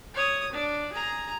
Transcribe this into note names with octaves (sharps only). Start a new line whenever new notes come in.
C#5 D#6
D4
G#4 A#5